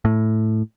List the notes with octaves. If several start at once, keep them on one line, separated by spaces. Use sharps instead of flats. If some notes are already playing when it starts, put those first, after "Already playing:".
A2